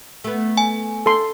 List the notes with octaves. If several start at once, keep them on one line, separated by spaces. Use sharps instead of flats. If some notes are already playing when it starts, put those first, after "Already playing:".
A3 B3
G#5
A4 C6